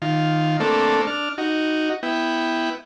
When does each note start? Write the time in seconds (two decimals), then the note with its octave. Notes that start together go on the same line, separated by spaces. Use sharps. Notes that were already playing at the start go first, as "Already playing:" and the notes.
0.02 D#3 F4
0.60 A3 A#3 C4 D4 A4
1.07 D4 F6
1.38 D#4 F#4
2.03 B3 E4 G5